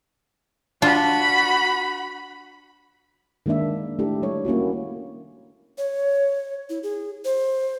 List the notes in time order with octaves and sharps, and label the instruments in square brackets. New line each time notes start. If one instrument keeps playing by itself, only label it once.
[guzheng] D4 F4 [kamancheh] F#4 B5
[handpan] D#3 G#3 A#3 D4 E5
A3 D4 E4 G4 A4
G3 D4 C#5
A#3 C#4 E4 F#4
[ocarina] C#5
E4
G#4
C5